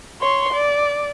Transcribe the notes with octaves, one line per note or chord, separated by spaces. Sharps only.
C#5 C6
D5